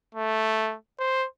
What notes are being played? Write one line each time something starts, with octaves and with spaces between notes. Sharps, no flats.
A3
C5